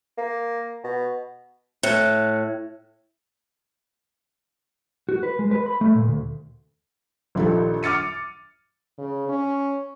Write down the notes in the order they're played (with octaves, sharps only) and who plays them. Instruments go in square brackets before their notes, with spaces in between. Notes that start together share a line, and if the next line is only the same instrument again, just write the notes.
[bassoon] A#3
B2
[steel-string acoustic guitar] A2 [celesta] F#6 C#7
[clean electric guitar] F#4
B4
G#3
B4
B5
A3
A#2
D2
[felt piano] A#1 D#3 F4 G4 A4
D6 F6 A6 C#7 D#7
[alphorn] C#3
C#4